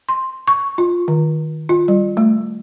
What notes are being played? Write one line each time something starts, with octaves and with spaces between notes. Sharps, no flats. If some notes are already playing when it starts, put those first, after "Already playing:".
C6
C#6
F4
D#3
F4
G3
A3